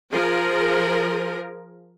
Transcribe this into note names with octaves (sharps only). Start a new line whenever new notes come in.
F3 G#4 A#4